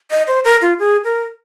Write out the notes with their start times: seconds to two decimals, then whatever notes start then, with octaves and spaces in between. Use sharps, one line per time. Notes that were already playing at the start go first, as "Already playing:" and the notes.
0.11 D#5
0.28 C5
0.45 A#4
0.62 F4
0.79 G#4
1.04 A#4